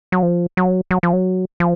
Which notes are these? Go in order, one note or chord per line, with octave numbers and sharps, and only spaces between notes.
F#3
F3
F#3
F#3
F3
F#3
F3